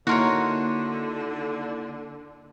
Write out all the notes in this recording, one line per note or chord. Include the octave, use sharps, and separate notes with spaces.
D3 A#3 D#4 E4 F#4 A#4 C#5 C6